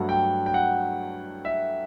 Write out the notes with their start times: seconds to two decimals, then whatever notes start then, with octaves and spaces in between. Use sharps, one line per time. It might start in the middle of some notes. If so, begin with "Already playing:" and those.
Already playing: G2 F#3 A3 F#5
0.09 G5
0.46 G5
0.54 F#5
1.45 E5